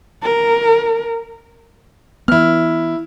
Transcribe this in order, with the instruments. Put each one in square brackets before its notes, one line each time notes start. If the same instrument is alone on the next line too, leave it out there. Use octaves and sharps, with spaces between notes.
[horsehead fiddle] A#4
[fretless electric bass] E3 B3 [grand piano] E4 F6